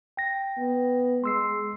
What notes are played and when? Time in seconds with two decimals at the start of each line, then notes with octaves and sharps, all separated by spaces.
0.17 G5 A#6
0.59 B3
1.24 G#3 C6 E6 C7